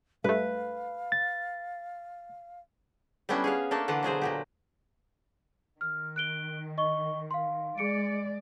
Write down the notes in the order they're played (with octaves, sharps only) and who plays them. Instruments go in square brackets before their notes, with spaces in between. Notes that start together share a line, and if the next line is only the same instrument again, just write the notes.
[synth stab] G2 A3 [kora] B4 [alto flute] F5
[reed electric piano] A6
[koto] G3 A3 B3 C#4 D4 E4
G#4 C#5 F5
A3 A#3 D4 A4
D3 E3 F4 F#5
B2 F#3 G#4 C5
A#2 F#3 G4
[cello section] D#3 [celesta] F6
[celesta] F#6 D7 G7
D#5 C#6 G7
F5 C6
[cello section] G#3 D5 [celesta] G#4 C#7 D7